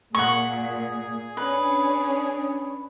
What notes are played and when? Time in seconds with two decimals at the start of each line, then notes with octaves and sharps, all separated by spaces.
0.15 A#2 G#4 F#5 C#6
1.37 C#4 D4 B4